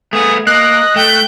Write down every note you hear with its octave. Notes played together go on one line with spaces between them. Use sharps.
A3 B3 G#4
A#3 D#5 F#6
A3 G5 G6